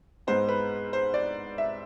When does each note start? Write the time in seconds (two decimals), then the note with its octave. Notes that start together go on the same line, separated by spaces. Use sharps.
0.27 G#2 G#3 B3 C5
0.49 B4
0.93 C5
1.14 D5
1.58 E5